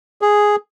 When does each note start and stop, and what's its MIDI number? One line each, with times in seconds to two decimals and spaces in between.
0.22 0.56 68